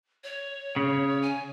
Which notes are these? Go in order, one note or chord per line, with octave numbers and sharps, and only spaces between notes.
C#5
C#3
G#5